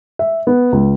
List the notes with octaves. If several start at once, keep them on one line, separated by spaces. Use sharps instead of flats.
E5
B3
C#2